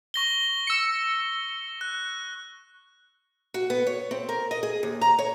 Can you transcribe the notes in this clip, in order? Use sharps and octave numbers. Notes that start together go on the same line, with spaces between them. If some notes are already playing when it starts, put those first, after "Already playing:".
C#6 A#6 G7
E6 C#7
F#6
F#4
B3
C#5
C4
A#4
D#5
G#4
D#2
A#5
C#5